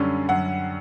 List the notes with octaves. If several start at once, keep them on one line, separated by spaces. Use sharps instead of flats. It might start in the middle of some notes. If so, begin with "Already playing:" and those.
Already playing: F#2 D3 G3 C#4
F#2 F#5